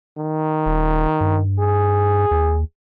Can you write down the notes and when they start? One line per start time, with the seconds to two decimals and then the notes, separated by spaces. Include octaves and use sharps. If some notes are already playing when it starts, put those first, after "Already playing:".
0.18 D#3
0.66 D#1
1.21 G2
1.59 G#4
2.31 D#2